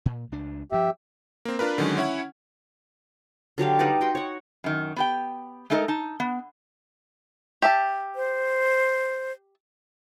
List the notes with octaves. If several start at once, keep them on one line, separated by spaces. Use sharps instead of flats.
A#2
C#2 D4
G2 F3 G4 E5
A#3 C4
D4 F4 A#4 B4
D3 D#3 F#3 G#3 C#4
C#4 E4 C#5 F#5
D3 F#3 G4 F5
G3 D#4 B4 D5
F#4 G5 C6
C#5 F#5
F#2 D#3
B3 G4 G5
G#3 A3 D#4 A4 A#4
D#4 A5
B3
G4 E5 A5
C5